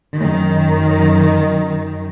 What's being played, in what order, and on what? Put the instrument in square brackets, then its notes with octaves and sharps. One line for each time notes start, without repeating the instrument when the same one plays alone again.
[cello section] F#2 D#3